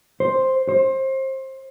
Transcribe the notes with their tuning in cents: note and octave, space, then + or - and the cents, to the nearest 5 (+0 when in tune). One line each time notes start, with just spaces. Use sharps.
C5 +5
C5 +25